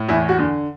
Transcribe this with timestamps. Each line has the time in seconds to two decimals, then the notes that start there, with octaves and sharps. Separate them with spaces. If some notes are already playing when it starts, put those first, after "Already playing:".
Already playing: A2
0.08 E2 E4
0.29 F#4
0.39 D3